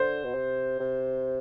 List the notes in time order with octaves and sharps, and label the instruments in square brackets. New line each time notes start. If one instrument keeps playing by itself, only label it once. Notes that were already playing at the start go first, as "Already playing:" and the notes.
Already playing: [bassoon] D3 [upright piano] C5
[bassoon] B2
C3
C3